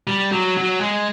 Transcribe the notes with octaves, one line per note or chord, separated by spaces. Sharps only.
G3
F#3
F#3
G#3